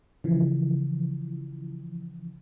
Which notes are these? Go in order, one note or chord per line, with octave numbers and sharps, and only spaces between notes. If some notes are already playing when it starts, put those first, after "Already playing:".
C#3 E3 F3